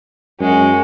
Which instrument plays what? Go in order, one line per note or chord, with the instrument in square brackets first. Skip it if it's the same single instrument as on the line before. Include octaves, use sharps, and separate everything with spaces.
[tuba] F#2 [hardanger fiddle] G#3 F#4